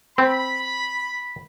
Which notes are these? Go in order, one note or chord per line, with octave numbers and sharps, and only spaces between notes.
C4 B5